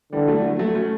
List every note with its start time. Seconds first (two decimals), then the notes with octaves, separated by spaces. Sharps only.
0.12 D3 E3 G3
0.28 F#3 A3
0.44 F#3 A3
0.59 F#3 A3
0.75 A3 C#4